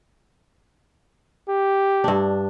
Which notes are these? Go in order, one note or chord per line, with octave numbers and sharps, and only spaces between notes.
G4
G2 D4